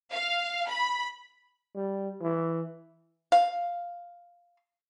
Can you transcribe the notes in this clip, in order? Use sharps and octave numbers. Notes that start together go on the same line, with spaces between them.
F5
B5
G3
E3
F5